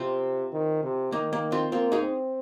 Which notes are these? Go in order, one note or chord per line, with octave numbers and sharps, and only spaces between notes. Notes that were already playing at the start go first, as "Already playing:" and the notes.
Already playing: C3 C4 F4
D#3
C3
D#3 A#3 D#4
A#3
C4 F4
A#3 C4 F4
D#4 G#4
C4